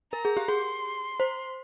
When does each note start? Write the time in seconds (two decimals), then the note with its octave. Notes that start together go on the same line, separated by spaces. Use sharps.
0.13 A#4 A#5
0.25 G#4
0.37 G4
0.48 G#4 C6
1.20 C5